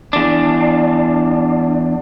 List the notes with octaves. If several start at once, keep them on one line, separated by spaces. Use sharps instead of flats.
E2 D4